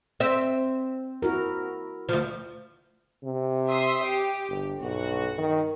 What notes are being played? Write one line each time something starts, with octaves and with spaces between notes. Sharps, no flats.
C4 E5
E4 F#4 A#4
D2 F3
C3
E5 C6 D#6
G4
G1
B1 G2 F#4
D#3